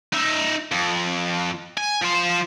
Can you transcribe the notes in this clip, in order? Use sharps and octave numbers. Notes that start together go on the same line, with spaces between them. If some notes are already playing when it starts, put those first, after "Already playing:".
D#4 E5
F2
G#5
F3 C5